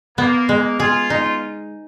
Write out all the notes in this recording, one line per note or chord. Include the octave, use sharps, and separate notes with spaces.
A#3 B3
G#3
F4 G#4
D#4